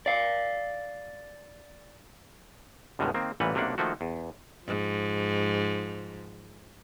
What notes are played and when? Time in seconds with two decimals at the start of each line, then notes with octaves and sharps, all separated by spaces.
0.06 D5 F5
2.99 C#2 G2 B2 D3 D#3
3.14 D#3 A#3 C4
3.40 A1 A#2 E3 G3 B4 F#5
3.54 B1 C3 A3 A#3 D4 F#5
3.78 D#3 F3 A3 A#3 F#4
4.01 E2
4.64 G#2 F3